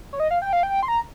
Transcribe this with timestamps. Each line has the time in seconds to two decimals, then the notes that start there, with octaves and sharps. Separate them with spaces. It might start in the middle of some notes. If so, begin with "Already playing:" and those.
0.13 C#5
0.20 D#5
0.31 F5
0.42 G5
0.53 F5
0.63 G5
0.83 C6
0.88 A#5